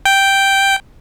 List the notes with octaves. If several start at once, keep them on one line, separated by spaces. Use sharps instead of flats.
G5